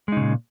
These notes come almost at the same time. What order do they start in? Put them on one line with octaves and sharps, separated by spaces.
G#3 D#4 C#3 A#2